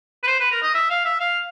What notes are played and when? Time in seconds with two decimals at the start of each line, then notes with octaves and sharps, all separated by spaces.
0.23 B4
0.27 C5
0.40 B4
0.52 A#4
0.63 D#5
0.75 E5
0.90 F5
1.05 E5
1.20 F5